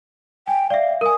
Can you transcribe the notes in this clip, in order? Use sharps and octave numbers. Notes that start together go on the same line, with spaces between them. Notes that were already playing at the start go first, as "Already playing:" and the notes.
G5 G#5
D5 E5 F5
A#4 G#5 D#6